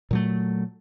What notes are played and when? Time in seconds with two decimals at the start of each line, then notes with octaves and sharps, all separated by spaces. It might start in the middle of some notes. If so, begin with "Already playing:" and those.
0.11 A#2 F#3 A3